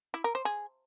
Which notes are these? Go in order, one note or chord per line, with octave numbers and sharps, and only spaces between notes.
E4
A#4
C5
G#4